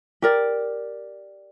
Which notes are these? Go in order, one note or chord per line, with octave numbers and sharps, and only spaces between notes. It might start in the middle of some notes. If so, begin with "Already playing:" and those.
G4 A#4 D5